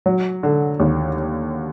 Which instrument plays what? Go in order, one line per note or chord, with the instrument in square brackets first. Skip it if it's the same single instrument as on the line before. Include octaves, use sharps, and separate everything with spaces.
[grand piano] F#3
D3
D#2